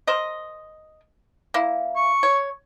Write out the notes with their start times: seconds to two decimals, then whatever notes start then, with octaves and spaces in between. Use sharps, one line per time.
0.07 A#4 C5 D#5
1.54 A#3 E4
1.96 C#6
2.23 C#5